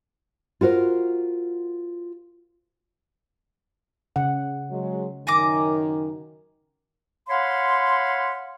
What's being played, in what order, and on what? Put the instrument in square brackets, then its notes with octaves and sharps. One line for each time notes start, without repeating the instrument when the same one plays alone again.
[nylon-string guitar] F4 F#4 A#4 C5
[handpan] C#3 F#5
[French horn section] F#3 G#3
[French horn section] F#2 D#3 [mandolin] G#5 A#5 D6
[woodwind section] C#5 F5 F#5 B5 C6